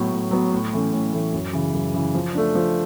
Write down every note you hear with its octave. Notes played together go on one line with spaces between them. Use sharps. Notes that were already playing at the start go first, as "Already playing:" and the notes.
Already playing: A2 F#3 B3
A2
F#3 B3
A2
E3 A3 C#4
A2
E3 A3 C#4
F#2
C#3 E3
F#2
C#3 E3
F3
A3 D4
F3